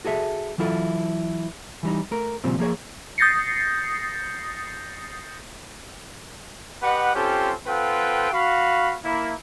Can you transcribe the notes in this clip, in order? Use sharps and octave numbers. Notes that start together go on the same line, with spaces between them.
F#4 G#4 A4 E5
E3 F#3 E4 F4 A4
E3 G3 D#4
A3 A#4
A#2 C#3 F3 G3 C4
F3 A#3 G#4 C#5
D#6 G6 A6 A#6 C7 C#7
G4 B4 D#5 F#5
C4 C#4 F4 G4 A4
C4 F4 A4 B4 F#5 G5
F#4 F5 B5
A#3 E4